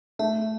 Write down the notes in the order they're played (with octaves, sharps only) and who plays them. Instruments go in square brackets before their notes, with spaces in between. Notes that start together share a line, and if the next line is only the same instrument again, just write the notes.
[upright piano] A3 [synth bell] E5